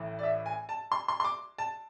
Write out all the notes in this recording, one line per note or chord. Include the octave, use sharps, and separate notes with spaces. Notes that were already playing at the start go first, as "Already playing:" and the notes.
Already playing: A1 A2 E3
D5
E5
G#5
A5
C6
C6
C6
D6
A5